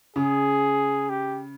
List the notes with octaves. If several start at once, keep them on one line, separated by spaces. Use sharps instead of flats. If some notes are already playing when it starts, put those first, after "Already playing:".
C#3 G#4
G4